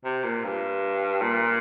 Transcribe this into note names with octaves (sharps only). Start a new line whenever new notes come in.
C3
A#2
G2
A#2